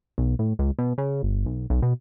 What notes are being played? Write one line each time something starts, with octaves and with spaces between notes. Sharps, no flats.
B1
A2
C#2
B2
C#3
G1
B1
B1
B2